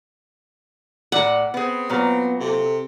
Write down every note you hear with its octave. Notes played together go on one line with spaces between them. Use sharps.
A2 D5 F#5 A#5
B3 C4 G#4
A#2 F#3 B3 A#5
C3 A4